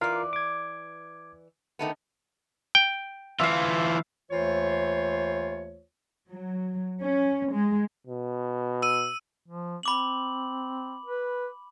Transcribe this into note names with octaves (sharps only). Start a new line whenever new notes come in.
E3 F4 A#4 D5 F5
D6 G#6
D#3 A3 B3
G5
E3 F4 E5 F5
D#2 E3 A3 F4 C5 C#5
F#3
C#4
G#3
B2
E6 D#7
F3
C4 B5 D6 F#7
B4